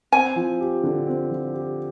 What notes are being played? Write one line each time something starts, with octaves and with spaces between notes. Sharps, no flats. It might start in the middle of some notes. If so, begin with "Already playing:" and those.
C4 G#5
F3
G4
D3
C4
F3
G4